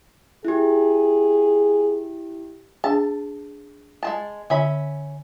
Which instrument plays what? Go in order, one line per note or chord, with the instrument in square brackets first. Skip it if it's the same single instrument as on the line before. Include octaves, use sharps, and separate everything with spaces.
[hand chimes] E4 G4 [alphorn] G#4
[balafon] D4 G#4 [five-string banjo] A5
[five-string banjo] G#3 F4 A5
[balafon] D3 [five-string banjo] C#4 E5 B5